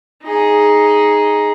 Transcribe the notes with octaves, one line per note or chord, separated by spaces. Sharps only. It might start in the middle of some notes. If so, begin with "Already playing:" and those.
D#4 G#4